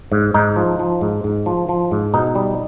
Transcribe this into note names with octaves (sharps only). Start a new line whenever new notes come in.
G#2
G#2 D#4
F3
F3
G#2
G#2
F3
F3
G#2
B2 D#4
G3